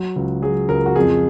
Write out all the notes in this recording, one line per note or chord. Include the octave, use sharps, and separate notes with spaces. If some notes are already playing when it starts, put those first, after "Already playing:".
Already playing: F#3
C#2
F#3 G#4
C#2 A#4
F#4
F2 G#4